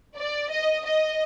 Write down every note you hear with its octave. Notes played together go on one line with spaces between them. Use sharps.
D5
D#5
D#5